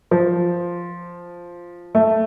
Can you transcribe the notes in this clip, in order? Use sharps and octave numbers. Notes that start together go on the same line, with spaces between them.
F3
A3